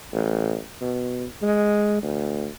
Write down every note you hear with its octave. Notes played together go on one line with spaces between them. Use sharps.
A1
B2
G#3
D2